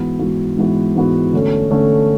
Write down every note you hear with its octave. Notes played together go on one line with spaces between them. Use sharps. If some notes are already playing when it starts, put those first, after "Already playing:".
Already playing: G#2 E3 B3 F#4
G#2 E3 B3 F#4
G#2 E3 B3 F#4
G#2 E3 B3 F#4
D3 A3 C#4
D3 A3 C#4